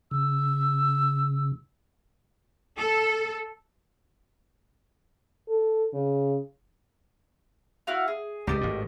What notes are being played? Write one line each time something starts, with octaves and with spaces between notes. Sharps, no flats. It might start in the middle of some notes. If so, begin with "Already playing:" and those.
C#3 E6
A4
A4
C#3
E4 F#4 F5
G#4
C#2 A2 G4 D5 D#5
G#1 A2